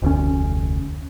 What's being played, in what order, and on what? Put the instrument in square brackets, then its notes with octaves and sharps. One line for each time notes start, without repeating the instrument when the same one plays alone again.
[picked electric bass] F1 D2 C#4